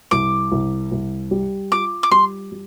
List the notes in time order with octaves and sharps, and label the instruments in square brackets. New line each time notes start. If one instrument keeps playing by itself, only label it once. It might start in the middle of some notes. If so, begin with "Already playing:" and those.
[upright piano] C2 [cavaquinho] D6
[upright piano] C2
C2
G3
[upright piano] F4 [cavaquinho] D6
[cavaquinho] D6
[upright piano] G3 [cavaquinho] C6
[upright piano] G3